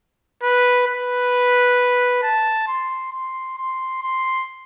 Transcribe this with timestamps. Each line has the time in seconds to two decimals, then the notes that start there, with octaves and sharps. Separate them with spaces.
0.42 B4
0.87 B4
2.22 A5
2.68 C6
3.13 C6
3.58 C6
4.03 C6